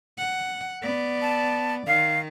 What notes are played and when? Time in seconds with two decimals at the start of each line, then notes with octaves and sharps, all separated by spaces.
0.18 F#5
0.82 B3 D5
1.22 A5
1.87 D#3 F5